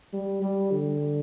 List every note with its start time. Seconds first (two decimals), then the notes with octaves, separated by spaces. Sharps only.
0.13 G3
0.42 G3
0.71 D3